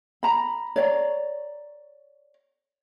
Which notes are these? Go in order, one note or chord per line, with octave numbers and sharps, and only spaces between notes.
A#5 B5
C#5 D5 A#5